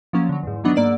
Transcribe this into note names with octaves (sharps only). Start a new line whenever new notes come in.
F3 F#3 A#3 C#4
D3 F#3
E2 G#2
D#3 E3 F#3 B3 D4 D#4
G#2 A#3 D5 F#5 E6